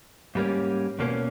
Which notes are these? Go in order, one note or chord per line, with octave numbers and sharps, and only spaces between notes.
G#2 G3 A#3 C#4
E2 B2 A#3 C#4